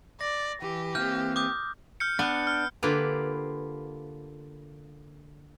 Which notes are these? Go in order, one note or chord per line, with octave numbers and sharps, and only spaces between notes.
D5 A#6
E3 G4
E3 A#3 C4 F6 G6
D6 D#6 G6
F6 G6 C#7
B3 D4
F6
D3 A#3 F4 G4 B4